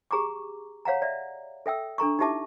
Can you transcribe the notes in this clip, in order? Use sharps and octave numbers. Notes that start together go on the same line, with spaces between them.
G4 G#4 A#5 C#6 D6
C#5 F5 F#5 A#5
D5 E5
A4 E5 G5 E6
D4 A4 A#5 C#6
D#4 E4 G4 E5 A5 D6